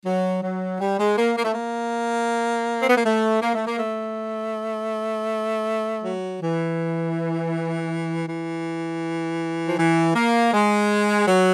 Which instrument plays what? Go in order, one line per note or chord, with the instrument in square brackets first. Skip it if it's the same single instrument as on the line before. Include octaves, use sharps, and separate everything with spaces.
[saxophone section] F#3
F#3
G3
G#3
A#3
A#3
A3
A#3
C4
B3
A#3
A3
A#3
A3
A#3
A3
F#3
E3
E3
F3
E3
A#3
G#3
F#3